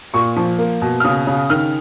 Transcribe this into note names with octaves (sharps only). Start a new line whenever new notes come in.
A#2 C#6
F3
A#3
B2
F6
C#3 D#6
C#3
D#3 F6